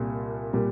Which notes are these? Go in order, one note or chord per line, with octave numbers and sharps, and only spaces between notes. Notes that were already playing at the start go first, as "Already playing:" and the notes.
Already playing: C2 A#2 G3
A#2 G3